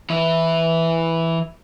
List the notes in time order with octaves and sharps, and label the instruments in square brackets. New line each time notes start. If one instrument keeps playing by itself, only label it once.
[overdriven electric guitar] E3 E4